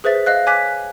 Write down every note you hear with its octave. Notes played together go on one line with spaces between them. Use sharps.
G#4 B4 C5 E5 A6
D#5 F5 F#6
C#5 G#5 D6 F#6 B6